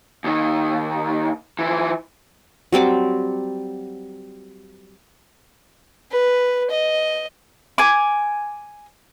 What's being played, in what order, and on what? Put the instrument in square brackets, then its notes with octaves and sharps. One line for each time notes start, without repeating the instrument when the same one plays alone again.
[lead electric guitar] D#2 D#3
E3 F3
[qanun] F#3 G3 C4 D6
[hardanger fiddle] B4
D#5
[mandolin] G#5 D6